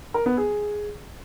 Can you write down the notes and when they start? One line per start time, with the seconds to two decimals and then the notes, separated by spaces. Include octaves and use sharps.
0.14 A#4
0.26 B3
0.37 G#4